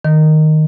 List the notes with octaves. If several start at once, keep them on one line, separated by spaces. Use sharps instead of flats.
D#3